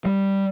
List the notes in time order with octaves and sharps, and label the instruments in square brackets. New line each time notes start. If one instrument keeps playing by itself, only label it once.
[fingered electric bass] G3